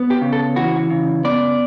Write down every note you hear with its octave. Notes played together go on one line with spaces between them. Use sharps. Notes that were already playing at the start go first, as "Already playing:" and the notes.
Already playing: B3
G4
C#3
A4
E3 F#4
C#3
B3 D5